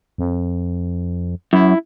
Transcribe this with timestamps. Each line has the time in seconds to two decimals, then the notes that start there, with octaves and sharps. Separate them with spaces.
0.18 F2
1.53 F#2 E4